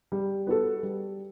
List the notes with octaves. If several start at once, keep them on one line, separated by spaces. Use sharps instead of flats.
G3
B3 F#4 A4
G3